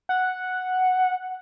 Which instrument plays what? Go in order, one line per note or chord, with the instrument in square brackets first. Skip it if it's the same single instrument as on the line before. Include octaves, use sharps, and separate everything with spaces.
[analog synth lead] F#5